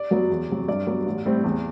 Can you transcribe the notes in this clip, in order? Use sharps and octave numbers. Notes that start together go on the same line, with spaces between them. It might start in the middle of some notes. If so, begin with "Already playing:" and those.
Already playing: D5
F#2 F#3 B3
E2
C3 F#3
G2 D5
F#3 B3
A1
A2 G3 C4
E2